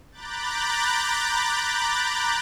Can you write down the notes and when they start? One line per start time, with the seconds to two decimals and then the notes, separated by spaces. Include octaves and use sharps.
0.11 A#5 B5 D6 F#6 G6 A6